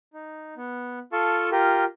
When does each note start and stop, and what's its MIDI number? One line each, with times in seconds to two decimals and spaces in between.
0.13 0.54 63
0.57 0.99 59
1.12 1.50 65
1.12 1.50 69
1.12 1.50 77
1.12 1.50 81
1.12 1.50 85
1.52 1.84 65
1.52 1.84 67
1.52 1.84 70